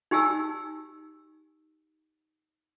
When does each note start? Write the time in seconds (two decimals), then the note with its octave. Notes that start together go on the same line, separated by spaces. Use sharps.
0.11 D#4 G4 G#5 A5 E6